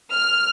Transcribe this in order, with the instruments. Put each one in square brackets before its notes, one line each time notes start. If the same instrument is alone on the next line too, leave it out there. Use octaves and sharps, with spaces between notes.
[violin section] F6